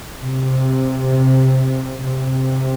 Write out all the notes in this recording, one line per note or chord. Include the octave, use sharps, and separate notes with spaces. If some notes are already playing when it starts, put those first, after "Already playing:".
C3
C3